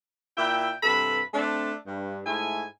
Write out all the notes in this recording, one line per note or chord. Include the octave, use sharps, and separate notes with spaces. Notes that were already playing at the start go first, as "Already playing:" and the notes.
A#2 E4 E5 G5
G2 C3 A4 B4 B5
A3 C4 D4
G2
G#2 A3 E4 G#5